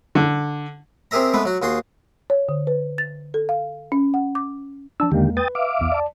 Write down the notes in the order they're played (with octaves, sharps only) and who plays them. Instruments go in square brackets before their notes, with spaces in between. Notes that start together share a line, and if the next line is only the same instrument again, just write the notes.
[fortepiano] D3
[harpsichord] C4 G4 G#4 A#4 E5 A#5
G#3 A3 B3 B4
F#3 F#4
D#2 F#4 G#4 C6
[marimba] C#5
D3
B4
A6
A4
F5
C#4
F#5
D6
[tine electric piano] F3 A5 E6 [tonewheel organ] D4
[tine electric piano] E2 G#3 A#3 [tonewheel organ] D3 D#3 G4
[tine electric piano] B4 [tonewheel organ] G5 D#6 A6
[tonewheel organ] E5 F5 D6
[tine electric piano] B1 E2
D5 A5